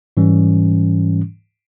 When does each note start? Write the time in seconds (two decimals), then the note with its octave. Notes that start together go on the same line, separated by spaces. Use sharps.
0.17 G#2 E3 G3 C#4